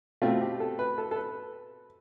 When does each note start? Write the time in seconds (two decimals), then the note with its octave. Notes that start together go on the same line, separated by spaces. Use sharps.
0.22 B2 A3 C4 F4
0.41 G4
0.60 A4
0.79 B4
0.98 A4
1.11 A4
1.16 B4